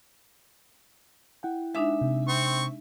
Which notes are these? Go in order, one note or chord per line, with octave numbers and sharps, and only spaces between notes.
E4 F#5 G5
G#3 D4 D#4 E5
C3
C4 C#6